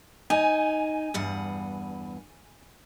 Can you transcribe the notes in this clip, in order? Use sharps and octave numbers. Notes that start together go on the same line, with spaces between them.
D#4 G#5
E2 G2 F#5